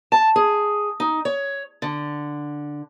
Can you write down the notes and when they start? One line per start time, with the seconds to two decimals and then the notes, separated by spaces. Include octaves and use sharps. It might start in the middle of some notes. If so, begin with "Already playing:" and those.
0.12 A5
0.36 G#4
1.00 D#4
1.25 C#5
1.82 D3